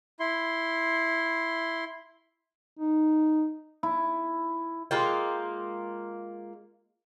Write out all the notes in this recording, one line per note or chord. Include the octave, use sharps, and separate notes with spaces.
E4 C6
D#4
E4
G#3 A#3 F4 G5